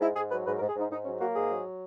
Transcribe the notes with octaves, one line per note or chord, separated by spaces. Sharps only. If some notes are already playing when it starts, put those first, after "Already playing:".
G#2 E4
G#2 G#4
F#3 B4
G#2 B4
A#4
G#2
G#4
G#2 D#4
G#2 D#4
F#3 C#4
A#3 F#4
G#2 G#4
F#3